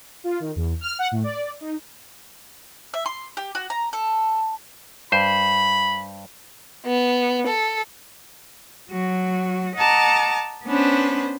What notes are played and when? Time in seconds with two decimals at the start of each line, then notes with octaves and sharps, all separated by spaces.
0.24 F4
0.40 D#3
0.56 E2
0.81 F6
0.99 F#5
1.11 A2
1.24 D5
1.61 D#4
2.94 E5
3.06 C6
3.37 G4
3.55 F#4
3.70 A#5
3.93 A4
5.12 G2 C5 B5
6.86 B3
7.47 A4
8.90 F#3 F#4
9.76 D#5 F#5 A5 A#5 D6
10.66 B3 C#4 D4 B4 C5